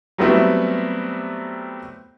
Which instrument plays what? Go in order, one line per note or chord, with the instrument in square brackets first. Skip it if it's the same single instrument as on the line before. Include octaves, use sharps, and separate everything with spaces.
[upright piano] F#3 G3 A3 B3 C4 E4